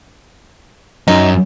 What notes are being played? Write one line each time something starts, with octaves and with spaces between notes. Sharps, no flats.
F#2 D#4